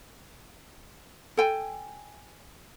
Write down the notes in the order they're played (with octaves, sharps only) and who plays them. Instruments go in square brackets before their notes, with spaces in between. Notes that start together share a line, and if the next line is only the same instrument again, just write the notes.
[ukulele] A4 G5 G#5